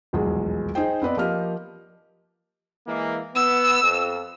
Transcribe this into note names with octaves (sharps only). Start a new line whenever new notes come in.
D#1 B1 E2 G#3 G#4
D#4 G#4 C5 G5
B3 C4 B4 D5 D#5
F3 A#3 G4 D#5 F6
E3 G#3 A#3
B3 E6
F2